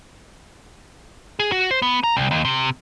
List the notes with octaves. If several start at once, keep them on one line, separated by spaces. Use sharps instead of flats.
G#4
F#4
C5
B3
A#5
C2
D#2
C3